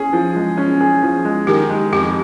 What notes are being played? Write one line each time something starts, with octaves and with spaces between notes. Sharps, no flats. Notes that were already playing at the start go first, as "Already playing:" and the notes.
Already playing: C#4 G#4
F3
G#3
C#4
G#4
F3
G#3
D#3 G4
G#3
F2 G4